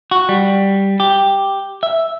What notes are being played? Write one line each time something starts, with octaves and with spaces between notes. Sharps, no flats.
F#4
G3
G4
E5